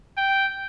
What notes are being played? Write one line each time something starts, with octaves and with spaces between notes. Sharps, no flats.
G5